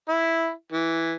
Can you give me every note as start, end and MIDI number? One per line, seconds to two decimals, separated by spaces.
0.09 0.51 64
0.72 1.14 52